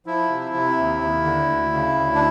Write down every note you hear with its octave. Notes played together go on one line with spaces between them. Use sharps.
F3 E4
C3
C3
D#2
D#2
D3
D2
C#3
D2
D4